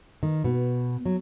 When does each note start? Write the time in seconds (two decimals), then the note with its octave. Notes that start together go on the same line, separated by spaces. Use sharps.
0.23 D#3
0.44 B2
1.06 F#3